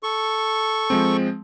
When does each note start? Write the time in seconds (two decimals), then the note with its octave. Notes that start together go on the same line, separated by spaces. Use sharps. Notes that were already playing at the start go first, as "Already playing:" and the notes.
0.03 A4 C#6
0.90 F3 G#3 C4